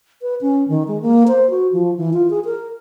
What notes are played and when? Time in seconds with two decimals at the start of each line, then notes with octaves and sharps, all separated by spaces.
0.22 B4
0.41 C#4
0.68 D#3
0.88 G#3
1.02 A#3
1.28 C5
1.50 F#4
1.73 F3
1.97 E3
2.14 F4
2.30 G#4
2.45 A#4